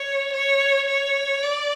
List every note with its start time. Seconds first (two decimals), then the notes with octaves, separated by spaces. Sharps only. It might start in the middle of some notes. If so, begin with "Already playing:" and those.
Already playing: C#5
0.33 C#5
0.88 C#5
1.43 D5